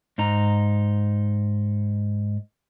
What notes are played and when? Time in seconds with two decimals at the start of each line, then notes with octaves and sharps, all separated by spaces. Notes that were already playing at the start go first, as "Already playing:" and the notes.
0.18 G#2 D#4 A#5